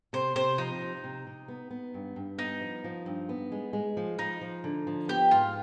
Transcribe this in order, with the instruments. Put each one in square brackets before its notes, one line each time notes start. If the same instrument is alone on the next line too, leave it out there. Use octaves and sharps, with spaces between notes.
[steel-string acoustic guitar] C3 [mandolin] C5
[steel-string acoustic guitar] C3 [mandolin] C5
[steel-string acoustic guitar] F3 [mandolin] D#4
[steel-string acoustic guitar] C3
C3
C3
B3
B3
G2
G2
[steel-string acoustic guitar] B3 [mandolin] D#4
[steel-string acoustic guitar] F3
F3
G2
B3
G#3
G#3
F3
[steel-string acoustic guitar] F3 [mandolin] D#4
[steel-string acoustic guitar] F3
D3
F3
[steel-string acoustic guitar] B3 [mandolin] G4
[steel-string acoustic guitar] G#2 [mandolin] F4